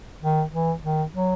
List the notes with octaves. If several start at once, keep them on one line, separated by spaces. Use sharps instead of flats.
D#3
E3
D#3
F#3